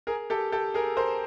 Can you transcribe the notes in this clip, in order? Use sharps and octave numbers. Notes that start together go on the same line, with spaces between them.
G#4 A#4
G4 A4
G4 A4
G#4 A#4
A#4 C5